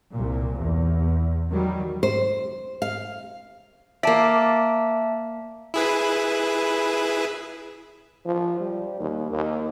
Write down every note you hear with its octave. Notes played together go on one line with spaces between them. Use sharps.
C2 A#2
E2
D#3 F#3 G3
C5
F5
A#3 D5 E5 A5
E4 G#4 B4
F3
G3
D#2
D#2